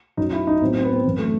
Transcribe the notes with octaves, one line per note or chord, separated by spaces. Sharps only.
F#2 F#3 D#4
E4
D#4
A2 F#3 C4
C4
B3
C4
F#2 E3 B3
A3